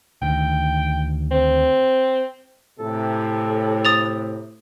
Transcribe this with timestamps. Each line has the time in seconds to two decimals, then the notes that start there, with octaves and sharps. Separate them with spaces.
0.22 D2 D#3 G5
1.31 C4
2.80 A2 C3 A4
3.85 D#6 A6 F7